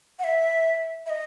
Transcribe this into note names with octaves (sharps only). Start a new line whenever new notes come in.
F#5
E5
E5
D#5